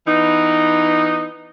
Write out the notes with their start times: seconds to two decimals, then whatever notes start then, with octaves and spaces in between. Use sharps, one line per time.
0.07 E3 B3 D#4